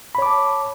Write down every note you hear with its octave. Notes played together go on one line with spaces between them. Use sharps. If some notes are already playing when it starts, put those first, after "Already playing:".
C#5 A5 B5 D6